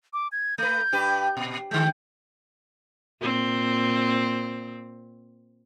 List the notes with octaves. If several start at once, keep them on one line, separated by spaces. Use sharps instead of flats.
D6
G#6
A3 B4 G6
G2 G4 B4
A#2
D3 G#3 G6
A#2 C4